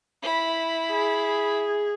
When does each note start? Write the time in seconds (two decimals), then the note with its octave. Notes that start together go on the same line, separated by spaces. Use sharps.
0.23 E4 B5
0.91 G#4